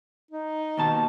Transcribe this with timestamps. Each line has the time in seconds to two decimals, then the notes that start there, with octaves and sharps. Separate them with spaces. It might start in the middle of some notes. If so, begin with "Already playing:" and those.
0.31 D#4
0.78 D#2 B2 A5